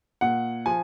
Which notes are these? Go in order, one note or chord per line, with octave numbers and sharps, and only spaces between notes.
A#2 F#5
F3 G#5